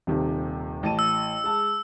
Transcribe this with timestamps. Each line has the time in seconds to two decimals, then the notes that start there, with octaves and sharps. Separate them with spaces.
0.07 D#1 C3 D#3
0.83 A1 A5 D#7
0.99 E6
1.44 G#3 A5